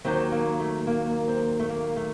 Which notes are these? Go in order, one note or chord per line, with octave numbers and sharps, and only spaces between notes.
D#2 D#3 F#3 C4
A#3
A3
A#3
C4
A3
A#3
A3